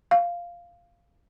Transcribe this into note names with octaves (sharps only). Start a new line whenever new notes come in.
F5